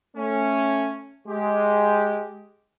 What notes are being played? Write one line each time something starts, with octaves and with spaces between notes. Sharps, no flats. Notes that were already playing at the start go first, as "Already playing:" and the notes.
A3 C#4
G#3 G4